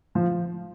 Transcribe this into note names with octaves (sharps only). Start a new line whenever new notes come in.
F3